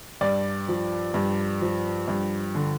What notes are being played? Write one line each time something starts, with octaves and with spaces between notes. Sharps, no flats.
G2 D5
F3
G2
F3
G2
D3